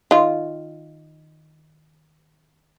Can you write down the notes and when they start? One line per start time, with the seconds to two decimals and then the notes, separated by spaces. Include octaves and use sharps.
0.11 D#3 F4